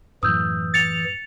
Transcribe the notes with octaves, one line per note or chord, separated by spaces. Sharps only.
F#2 A2 E3 F#3 D#6 E6 G6
A6 C#7 F7